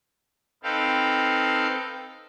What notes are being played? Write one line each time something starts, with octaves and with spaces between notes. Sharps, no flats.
C4 D#4 A4 B4 F5 G5